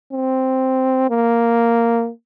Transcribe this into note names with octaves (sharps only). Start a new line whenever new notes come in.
C4
A#3